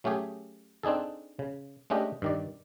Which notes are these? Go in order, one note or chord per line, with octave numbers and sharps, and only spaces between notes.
F#3 A3 C#4 G4 G#4
C4 D4 D#4 G#4 A4
C#3
G#3 A3 C#4 D4 G4 D#5
G2 D#3 D5